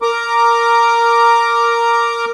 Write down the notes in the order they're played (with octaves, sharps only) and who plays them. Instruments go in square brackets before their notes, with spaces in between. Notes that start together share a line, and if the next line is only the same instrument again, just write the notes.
[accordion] A#4 A#5 D6